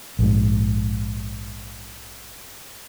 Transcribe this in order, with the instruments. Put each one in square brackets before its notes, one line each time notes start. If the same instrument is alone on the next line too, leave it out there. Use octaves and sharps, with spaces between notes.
[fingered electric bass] A#1 G#2